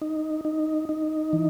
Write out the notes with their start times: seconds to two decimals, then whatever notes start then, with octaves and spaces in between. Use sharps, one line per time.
0.02 D#4
0.45 D#4
0.89 D#4
1.33 E3